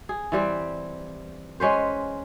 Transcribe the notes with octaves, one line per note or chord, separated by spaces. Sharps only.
G#4
E3 G3 C4
G#3 C#4 B4 C5